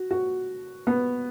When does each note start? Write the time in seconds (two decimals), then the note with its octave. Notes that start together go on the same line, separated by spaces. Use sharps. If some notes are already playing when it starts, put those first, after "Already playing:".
Already playing: F#4
0.11 F#4
0.87 B3